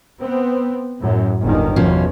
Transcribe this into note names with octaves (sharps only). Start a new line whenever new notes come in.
B3 C4
F#2 A2
G1 D#2 D#3
E2 B2 F3 C#4